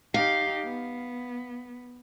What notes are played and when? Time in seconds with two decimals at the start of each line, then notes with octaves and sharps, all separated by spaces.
0.14 D#4 G4 F5
0.64 B3